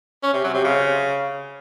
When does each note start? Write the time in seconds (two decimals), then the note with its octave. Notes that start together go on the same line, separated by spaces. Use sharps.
0.23 C#4
0.33 C3
0.44 F#3
0.54 C3
0.64 C#3